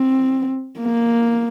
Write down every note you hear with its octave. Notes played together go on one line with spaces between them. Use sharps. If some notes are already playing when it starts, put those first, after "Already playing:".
Already playing: C4
A#3